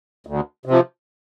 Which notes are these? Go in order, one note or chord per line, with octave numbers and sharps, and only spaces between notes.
D2
C3
F3